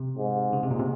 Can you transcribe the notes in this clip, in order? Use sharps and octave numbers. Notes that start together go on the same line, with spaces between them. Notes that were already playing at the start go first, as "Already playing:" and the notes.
Already playing: C3
G#2
C#3
C3
A#2
C3